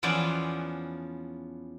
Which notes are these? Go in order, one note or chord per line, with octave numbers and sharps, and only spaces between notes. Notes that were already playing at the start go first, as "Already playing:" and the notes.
E2 F3 B3 C#4 D5